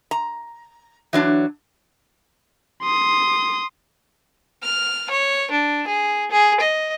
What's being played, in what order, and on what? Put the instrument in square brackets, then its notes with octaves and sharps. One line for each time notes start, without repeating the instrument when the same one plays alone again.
[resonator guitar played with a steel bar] A#5
E3 F#3 D4
[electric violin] C6 D#6
[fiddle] F6
C#5
D4
G#4
G#4
D#5